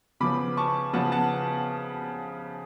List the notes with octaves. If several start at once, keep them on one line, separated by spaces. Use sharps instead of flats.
C#3 F3 B3 B5 D6
A5 C#6
C#3 F3 B3 F#5 A5
F#5 A5